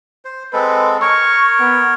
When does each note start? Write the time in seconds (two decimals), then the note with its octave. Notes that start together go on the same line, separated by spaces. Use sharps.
0.25 C5
0.53 G#3 C4 A4 B4
1.02 A#4 C#5 C#6
1.60 B3